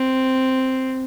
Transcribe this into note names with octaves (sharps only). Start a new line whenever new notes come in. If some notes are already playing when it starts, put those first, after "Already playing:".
Already playing: C4